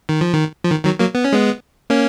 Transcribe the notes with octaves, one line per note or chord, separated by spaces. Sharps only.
D#3
F3
D#3
F3
D#3
D#3 F#3
F#3 A#3
B3
C#4
G#3 B3
A#3 C#4